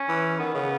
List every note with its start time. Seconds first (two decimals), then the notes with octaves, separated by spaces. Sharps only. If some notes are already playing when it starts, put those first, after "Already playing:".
Already playing: C#4
0.09 E3
0.39 D#3 B3
0.54 C#3